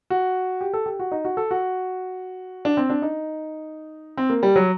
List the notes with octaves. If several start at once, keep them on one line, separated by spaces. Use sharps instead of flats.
F#4
G4
A4
G4
F#4
D#4
F#4
A4
F#4
D4
C4
D4
D#4
C4
A#3
G3
F#3